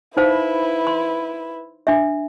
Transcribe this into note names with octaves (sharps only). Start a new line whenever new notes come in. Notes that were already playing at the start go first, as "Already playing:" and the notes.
D#4 E4 B4 C5 F5
C6
D4 E5